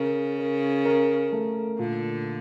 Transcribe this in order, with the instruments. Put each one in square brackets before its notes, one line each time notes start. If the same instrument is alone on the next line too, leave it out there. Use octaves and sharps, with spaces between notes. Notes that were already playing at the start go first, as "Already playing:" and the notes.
Already playing: [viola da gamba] C#3 [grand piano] A#4
[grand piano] A#4
A#4
A3
[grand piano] A#2 [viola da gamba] D3